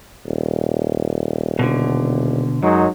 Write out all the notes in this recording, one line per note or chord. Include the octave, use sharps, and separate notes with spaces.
D#1
B2 D3
F#2 F#3 G#3 D#4